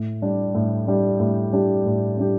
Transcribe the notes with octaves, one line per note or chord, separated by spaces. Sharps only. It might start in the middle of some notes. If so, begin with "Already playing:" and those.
Already playing: A2
G3 D4 G4
A2
G3 D4 G4
A2
G3 D4 G4
A2
G3 D4 G4